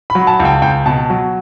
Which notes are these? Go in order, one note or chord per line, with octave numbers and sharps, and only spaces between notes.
B5
F#3
A5
C#2
G5
C#2 G5
B2 A5
F#3